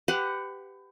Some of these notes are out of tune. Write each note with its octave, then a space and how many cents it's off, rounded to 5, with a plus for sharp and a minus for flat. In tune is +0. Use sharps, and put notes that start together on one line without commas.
G4 +0 B4 +30 F#5 +0